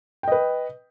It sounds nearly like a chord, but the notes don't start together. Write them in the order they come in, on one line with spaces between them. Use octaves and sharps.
G5 D#5 B4